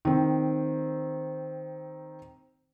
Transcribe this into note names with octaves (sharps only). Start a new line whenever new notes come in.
D#3 C4